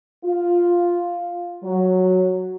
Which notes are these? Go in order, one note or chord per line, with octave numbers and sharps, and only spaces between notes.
F4
F#3